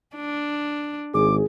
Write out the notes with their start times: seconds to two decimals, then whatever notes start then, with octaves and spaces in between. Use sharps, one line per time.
0.16 D4
1.14 G#1 G#4 D6